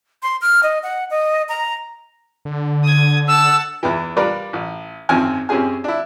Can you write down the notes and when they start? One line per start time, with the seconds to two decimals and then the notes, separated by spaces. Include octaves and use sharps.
0.23 C6
0.42 F6
0.63 D#5
0.83 F#5
1.11 D#5
1.49 A#5
2.45 D3
2.84 D#6 G#6
3.28 F#5 A5 E6
3.83 E2 E3
4.16 G3 D4 F4 A#4 B4 D5
4.53 A1
5.09 G#1 F#2 F3 C4 G#5
5.49 F#2 C4 C#4 G4 G#4 G#5
5.84 D4 E4